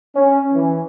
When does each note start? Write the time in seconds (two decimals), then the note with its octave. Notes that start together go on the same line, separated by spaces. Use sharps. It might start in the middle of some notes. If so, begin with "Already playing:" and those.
0.16 C#4
0.54 E3